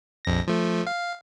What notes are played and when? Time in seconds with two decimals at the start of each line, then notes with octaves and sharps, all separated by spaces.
0.25 A#1 F2 A#6
0.48 F3 A3
0.87 F5